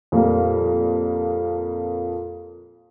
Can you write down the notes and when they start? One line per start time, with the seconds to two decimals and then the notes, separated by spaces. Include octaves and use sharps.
0.12 F2 A#2 G3 A#3